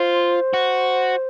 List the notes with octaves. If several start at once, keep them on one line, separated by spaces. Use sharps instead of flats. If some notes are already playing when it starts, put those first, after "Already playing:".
Already playing: F4 C5
F#4